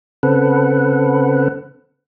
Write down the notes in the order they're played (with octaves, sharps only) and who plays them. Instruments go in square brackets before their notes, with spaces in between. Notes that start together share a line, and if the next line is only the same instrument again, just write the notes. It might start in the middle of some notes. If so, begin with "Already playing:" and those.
[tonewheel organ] C#3 C4 A4 B4 F#5